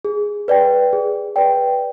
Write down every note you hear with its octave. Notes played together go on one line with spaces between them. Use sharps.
G#4
B4 D5 G5
G#4
B4 D5 G5